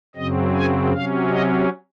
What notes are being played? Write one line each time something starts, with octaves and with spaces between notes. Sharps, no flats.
F#2 C#3 F#3 C4 D#5
G#5
C3 F#3 C#4 F5
D#5